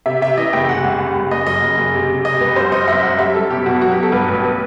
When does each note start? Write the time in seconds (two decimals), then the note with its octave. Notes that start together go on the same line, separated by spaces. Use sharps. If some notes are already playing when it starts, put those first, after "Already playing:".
0.06 C3 E5
0.22 C3 E5
0.37 E3 D#5
0.53 F#1 G5
0.69 C3 F#5
0.84 C2
1.00 C2
1.16 C2
1.31 F#1 D#5
1.47 F#2 D#5
1.62 F#1
1.78 F#1
1.94 C3
2.09 C3
2.25 C3 D#5
2.40 C2 B4
2.56 F#2 C5
2.72 F#2 D#5
2.88 F#2 E5
3.03 F#2 F#5
3.19 G3 E5
3.34 G3 A4
3.50 B2 G4
3.66 B2 F#4
3.82 F#3 F#4
3.92 G4
3.97 F#3
4.03 A4
4.12 G2 B4
4.28 A1
4.44 B4